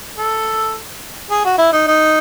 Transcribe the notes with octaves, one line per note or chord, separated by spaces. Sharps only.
A4
G#4
F#4
E4
D#4
D#4